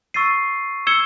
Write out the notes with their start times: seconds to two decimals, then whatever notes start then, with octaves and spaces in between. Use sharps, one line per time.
0.14 C#6 E6 A6 C7 D#7
0.87 E6 G#6 C#7 E7 G7